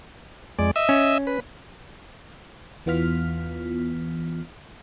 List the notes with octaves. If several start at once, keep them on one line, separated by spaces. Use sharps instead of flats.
F2 G#3 D5
D#5 E5 E6
C#4
B4
E2 E3 B3 F4 F6 B6